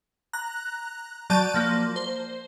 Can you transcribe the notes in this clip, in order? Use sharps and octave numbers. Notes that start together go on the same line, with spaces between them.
A#5 F#6
F#3 D5 A5 G6 D#7
F3 A#3
C5